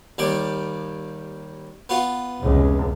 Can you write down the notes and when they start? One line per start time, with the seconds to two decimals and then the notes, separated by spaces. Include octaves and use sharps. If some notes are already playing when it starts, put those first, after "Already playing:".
0.18 D#2 G3 D5
1.89 B3 F4
2.41 F1 C#2